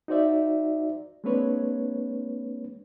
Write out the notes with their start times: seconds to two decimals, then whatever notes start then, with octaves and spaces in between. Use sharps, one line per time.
0.08 D#4 F#4 C5 D5 E5
1.24 G#3 A#3 C4 D4 B4 C#5